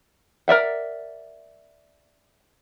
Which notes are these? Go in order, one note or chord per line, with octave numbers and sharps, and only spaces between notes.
A#4 D5 E5 F#5